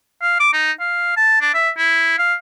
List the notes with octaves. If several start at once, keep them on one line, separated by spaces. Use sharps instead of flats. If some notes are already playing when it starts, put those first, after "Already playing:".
F5
D6
D#4
F5
A5
D4
E5
E4
F5